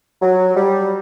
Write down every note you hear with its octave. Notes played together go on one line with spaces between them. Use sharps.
F#3
G3